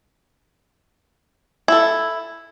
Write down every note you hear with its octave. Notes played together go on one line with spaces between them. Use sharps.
E4 A4